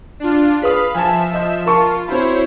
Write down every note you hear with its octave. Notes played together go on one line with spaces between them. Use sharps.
D4 F4
G#4 B4 F5 B5 D#6
F3 E5 G#5 A5 E7
D#5 G6
F4 A#4 A5 C#6
C4 E4 F#4 C5 C#5 B5